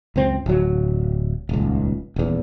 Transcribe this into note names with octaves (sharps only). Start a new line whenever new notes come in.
C#2 F#2 C4
D1 F#3
D#1 C#2
D#1 E2